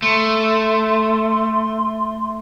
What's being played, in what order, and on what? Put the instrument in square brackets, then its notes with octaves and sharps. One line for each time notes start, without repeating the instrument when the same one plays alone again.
[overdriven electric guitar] A3 [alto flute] C6